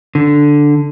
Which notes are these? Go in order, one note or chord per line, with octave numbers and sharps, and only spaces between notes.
D3